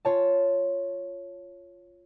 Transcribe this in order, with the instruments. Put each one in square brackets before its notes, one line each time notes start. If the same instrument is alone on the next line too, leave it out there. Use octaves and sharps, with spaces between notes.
[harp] F4 C#5 A5